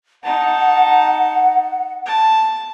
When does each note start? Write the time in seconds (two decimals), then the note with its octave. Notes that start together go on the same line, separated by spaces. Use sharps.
0.24 D#4 F#5 A5
2.06 A5